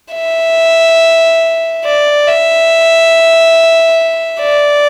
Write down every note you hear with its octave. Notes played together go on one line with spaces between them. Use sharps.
E5
D5
E5
D5